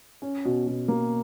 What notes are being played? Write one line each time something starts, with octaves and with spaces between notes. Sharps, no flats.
C#4
B2
B2
A#3